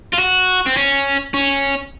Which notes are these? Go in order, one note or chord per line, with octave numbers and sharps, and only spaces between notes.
F4
F#4
C4
C#4
C#4